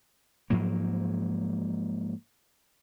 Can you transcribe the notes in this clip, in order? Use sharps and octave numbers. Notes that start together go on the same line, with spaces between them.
G#2 F3 F#3 A#3